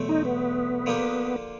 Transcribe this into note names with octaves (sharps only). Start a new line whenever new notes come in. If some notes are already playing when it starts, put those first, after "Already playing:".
Already playing: E2 B2 F#3 A3 C4
D#4
B3
D3 F3 A#3 D4 G4